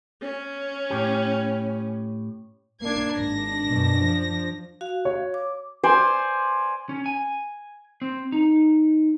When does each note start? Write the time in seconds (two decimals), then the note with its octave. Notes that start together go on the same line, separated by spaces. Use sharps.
0.21 C#4
0.90 A2 G4
2.81 A#3 D4 G#6 C7
3.16 G#1 D4 A#6
3.68 F#2 B2
4.01 F3
4.81 F#4 F5
5.05 C#5
5.34 D6
5.83 C5 D5 G#5
6.89 C#4
7.06 G#5
8.02 C4
8.32 D#4